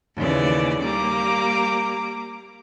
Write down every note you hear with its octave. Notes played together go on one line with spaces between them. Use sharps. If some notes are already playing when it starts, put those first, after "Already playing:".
D#2 C#3 E3 D5
G3 A#3 A#5 D6